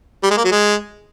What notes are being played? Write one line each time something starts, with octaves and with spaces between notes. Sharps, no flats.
G3
G#3
A#3
F#3
G#3